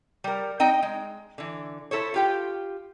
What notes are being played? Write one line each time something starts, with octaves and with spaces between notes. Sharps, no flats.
G3 A#4
C4 D#4 D#5 G5
G#3
D3 E3
E4 A4 C5 C#5
F4 G4 G5